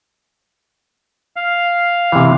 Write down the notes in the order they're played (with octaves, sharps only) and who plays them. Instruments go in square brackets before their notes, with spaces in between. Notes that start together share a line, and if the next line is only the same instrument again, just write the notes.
[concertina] F5
[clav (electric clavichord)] C3 E3